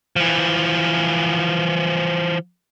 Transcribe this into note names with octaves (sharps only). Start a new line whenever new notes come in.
E3 F3